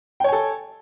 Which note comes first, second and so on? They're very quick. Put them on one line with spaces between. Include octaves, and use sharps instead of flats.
G5 C#5 G#5 A4